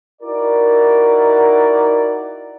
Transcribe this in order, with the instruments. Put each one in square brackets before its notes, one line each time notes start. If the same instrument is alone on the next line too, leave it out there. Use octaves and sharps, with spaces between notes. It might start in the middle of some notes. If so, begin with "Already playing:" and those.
[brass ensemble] D#4 E4 F#4 A#4 D5